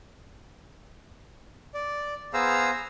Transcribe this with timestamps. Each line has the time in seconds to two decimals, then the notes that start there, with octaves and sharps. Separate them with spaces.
1.74 D5
2.33 B3 G#4 C5 F5 A#5 E6